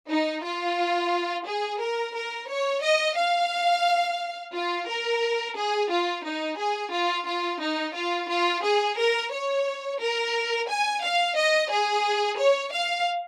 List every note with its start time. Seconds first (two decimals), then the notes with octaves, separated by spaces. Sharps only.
0.10 D#4
0.45 F4
1.48 G#4
1.81 A#4
2.15 A#4
2.49 C#5
2.83 D#5
3.17 F5
4.54 F4
4.88 A#4
5.57 G#4
5.91 F4
6.25 D#4
6.58 G#4
6.92 F4
7.27 F4
7.61 D#4
7.96 F4
8.29 F4
8.64 G#4
8.98 A#4
9.32 C#5
10.00 A#4
10.69 G#5
11.03 F5
11.36 D#5
11.71 G#4
12.39 C#5
12.73 F5